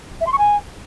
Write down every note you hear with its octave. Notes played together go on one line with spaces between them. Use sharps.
E5
C6
C#6
G#5